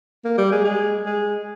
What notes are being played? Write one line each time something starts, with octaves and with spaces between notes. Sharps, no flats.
A#3
G3
G#3
G#3
G#3